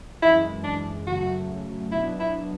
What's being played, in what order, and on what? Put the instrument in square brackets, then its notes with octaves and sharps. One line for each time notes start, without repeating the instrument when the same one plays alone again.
[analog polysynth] F#2 E3 G#3 [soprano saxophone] E4
[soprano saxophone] D4
[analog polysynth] F#2 C#3 F#3 A3 [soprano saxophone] F#4
[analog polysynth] B2 F#3 B3 D4 [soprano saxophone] E4
[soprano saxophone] E4